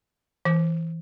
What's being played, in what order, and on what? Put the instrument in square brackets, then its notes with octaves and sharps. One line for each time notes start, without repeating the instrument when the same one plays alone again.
[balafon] E3